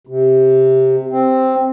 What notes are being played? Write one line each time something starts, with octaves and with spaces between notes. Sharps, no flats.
C3
C4